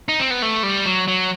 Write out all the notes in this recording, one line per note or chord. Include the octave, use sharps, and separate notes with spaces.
D#4
C4
B3
A3
G3
F#3
F#3